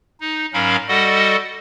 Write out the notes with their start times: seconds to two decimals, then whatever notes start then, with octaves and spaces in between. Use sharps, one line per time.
0.20 D#4
0.53 G#2 F#3 C#4 A#4 F5 B5
0.88 G3 F#4 A4 D#5 F#5